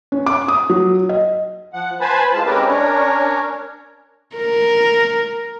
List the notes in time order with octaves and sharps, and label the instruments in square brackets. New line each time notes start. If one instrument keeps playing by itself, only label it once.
[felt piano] C#4
D6
D#6
F#3
D#5
[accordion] F3 F#5
B4 C5 G#5 A5 B5
A2 G#3 F4 A5
G#3 C4 C#4 G4 A#4 B4
C#4 D4 A#4 C#5
[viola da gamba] A#4